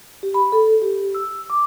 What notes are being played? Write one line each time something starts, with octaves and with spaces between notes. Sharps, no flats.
G4
B5
A4
G4
E6
D6